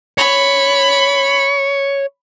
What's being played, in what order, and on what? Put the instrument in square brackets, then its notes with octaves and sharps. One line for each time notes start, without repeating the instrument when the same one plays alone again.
[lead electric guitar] C#5 [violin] B5